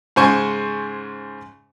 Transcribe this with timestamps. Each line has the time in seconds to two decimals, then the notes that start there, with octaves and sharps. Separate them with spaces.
0.16 G#2 C#3 C5 G#5 C#6